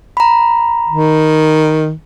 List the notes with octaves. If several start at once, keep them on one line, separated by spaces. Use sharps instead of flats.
A#5 B5
D#3